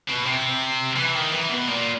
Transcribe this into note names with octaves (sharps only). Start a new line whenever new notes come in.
B2
C3
E3
D#3
E3
B2
A#2